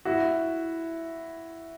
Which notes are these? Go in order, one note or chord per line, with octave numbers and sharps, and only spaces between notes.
E4 F#4